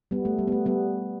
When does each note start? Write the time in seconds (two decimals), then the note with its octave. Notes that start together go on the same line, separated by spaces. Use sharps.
0.11 G3 B3
0.25 A3
0.38 G3
0.48 B3
0.52 A3
0.66 G3 B3